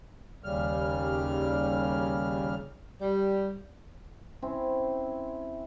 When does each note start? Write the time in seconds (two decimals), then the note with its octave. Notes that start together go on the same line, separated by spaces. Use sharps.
0.44 D#2 C#3 G3 F6
3.01 G3
4.42 C4 C#4 E4 C5